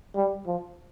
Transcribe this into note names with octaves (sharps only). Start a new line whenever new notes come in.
G3
F3